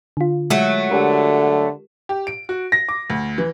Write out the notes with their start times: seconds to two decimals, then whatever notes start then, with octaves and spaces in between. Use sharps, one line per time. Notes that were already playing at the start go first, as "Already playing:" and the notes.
0.17 D3 F4
0.50 F#3 G#3 A3
0.91 D3 G4 A#4
2.09 G4
2.27 D7
2.49 F#4
2.72 A#6
2.89 D6
3.10 D2
3.38 E3